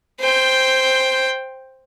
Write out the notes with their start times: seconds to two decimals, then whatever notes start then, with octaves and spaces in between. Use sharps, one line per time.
0.20 C5 G5